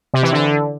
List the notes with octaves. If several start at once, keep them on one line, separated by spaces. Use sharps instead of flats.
C3
E3
D3